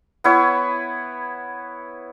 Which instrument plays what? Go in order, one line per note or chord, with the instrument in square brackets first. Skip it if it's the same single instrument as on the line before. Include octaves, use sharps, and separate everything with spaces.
[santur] B3 E4 C#5